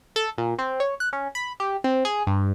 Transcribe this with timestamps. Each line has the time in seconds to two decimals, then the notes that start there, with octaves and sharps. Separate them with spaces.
0.16 A4
0.38 A#2
0.59 C4
0.80 C#5
1.00 F#6
1.13 C#4
1.35 B5
1.60 G4
1.84 C4
2.05 G#4
2.27 G2